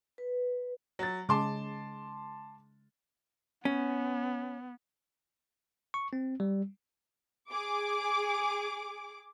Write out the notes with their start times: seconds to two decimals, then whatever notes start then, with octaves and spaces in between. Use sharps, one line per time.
0.18 B4
0.99 F#3 A6
1.29 C#3 G#3 A5 C6 D6
3.65 B3 C#4
5.94 C#6
6.13 C4
6.40 G3
7.52 G#4 D6